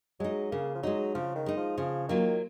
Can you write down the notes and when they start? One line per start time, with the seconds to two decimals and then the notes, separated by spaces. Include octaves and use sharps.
0.20 F#3 G#3 D#4
0.52 C#3 A#3
0.75 F3
0.83 F#3 G#3 D#4
1.14 C#3 F3
1.35 D#3
1.46 G#3 D#4
1.57 F3
1.77 C#3 F3
2.08 D#3 F#3 A#3 F4